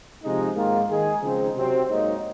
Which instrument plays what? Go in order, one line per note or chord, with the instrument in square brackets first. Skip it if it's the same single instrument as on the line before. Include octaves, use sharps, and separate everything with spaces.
[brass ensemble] C3 F3 G#3 D#4
G#2 D#3 A#3 F4
D#3 G#3 D#4 G#4
C#3 F3 G#3 C4 D#4
C3 F#3 C4
G#2 F#3 A#3 D#4